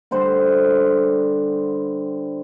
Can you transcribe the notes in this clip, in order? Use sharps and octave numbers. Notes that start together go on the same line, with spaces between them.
D3 G3 C5 F#5